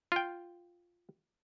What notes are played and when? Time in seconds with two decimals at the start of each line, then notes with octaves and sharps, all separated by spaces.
0.12 F4 G5